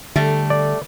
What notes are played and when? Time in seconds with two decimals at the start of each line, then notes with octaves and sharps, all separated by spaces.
0.16 D3 G3 A3
0.50 D5